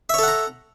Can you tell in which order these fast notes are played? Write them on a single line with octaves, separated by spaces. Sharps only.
E5 C#5 A4 F#5 A#5